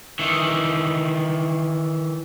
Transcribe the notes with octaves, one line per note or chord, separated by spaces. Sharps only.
D#3 E3